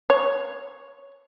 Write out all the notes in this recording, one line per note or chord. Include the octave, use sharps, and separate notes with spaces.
C#5